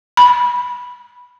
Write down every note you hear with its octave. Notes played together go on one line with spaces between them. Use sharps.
B5